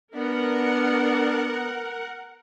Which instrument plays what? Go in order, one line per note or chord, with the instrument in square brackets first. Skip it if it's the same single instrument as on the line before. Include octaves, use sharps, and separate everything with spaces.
[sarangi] B3 [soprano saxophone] D4 [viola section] A#4 F#5